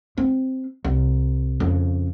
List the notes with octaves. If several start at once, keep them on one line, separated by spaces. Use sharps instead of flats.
C4
C2
F2 C#3